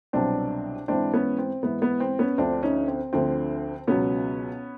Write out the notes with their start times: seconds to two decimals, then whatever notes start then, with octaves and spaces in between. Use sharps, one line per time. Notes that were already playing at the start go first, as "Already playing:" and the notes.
0.13 C2 B2 F#3 C4 D4
0.88 G#2 E3 C4 D4
1.13 B3 C#4
1.38 C4
1.63 G#2 E3 B3
1.82 B3
2.00 C4
2.19 B3 C#4
2.38 D2 D3 F3 C4 D4
2.63 C#4 D#4
2.88 C4
3.13 D2 D3 F3 C4
3.87 C#2 B2 F#3 B3 C#4